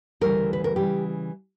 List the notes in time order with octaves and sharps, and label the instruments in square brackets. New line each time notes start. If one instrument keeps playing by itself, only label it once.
[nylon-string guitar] D2 C#3 E3 G3 A#4
B4
A#4
C#3 E3 G3 G4